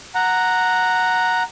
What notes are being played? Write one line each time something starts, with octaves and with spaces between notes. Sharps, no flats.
F#5 A#5